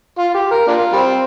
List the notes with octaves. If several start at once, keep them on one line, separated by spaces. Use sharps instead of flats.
F4
G4
A#4
A#3 D4 F4
G3 C4